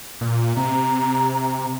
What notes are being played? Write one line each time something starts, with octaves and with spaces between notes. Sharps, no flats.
A#2
C3 A#5